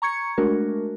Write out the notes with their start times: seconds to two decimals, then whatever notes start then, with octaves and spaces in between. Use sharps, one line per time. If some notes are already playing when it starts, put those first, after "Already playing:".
0.02 A#5 C#6 G#6 C#7
0.38 G#3 A3 D4 F#4 A#4